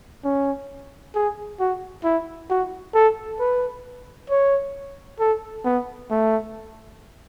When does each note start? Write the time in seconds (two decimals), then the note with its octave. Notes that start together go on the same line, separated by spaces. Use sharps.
0.24 C#4
1.15 G#4
1.60 F#4
2.04 E4
2.50 F#4
2.95 A4
3.40 B4
4.30 C#5
5.20 A4
5.65 B3
6.10 A3